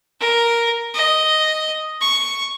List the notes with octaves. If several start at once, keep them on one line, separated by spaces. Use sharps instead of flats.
A#4
D#5
C#6